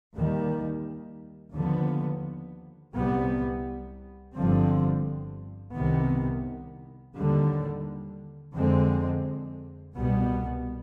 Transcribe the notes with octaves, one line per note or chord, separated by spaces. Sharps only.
D#2 D#3 G3
D#2 D3 F3 B3
C2 C3 G3 B3
G1 G2 D3 F3 C4
C2 C3 D#3 B3
D#2 D3 G3
F2 D3 G#3 C4
C2 B2 G3 B3